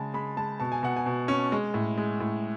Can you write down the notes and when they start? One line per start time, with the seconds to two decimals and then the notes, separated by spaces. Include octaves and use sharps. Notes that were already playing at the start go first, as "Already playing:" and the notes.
Already playing: C#3 G#3 G#5 A5
0.14 G#3 B5
0.37 G#3 A5
0.60 B2 A5
0.72 G#5
0.83 B2 F#5
0.96 G#5
1.06 B2
1.28 C#4
1.52 G#3
1.74 A2
1.97 G#3
2.20 A2